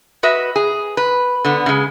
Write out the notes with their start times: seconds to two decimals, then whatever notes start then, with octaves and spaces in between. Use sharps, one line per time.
0.23 F#4 B4 D#5 E5
0.56 G#4
0.97 B4
1.45 D3 B3
1.66 C#3 G#3